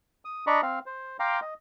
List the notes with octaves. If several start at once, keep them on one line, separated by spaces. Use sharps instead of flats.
D#6
D4 D5 D#5 A#5 B5 C#6
C4 F5
C5
F5 G5 A#5 C6 D6
D#5